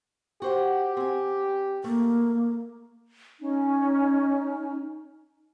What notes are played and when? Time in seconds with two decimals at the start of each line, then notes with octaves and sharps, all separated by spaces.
0.42 F#4 G4 C5 F#5
0.97 C4 G#5
1.84 A3 A#3
3.40 C#4 D#4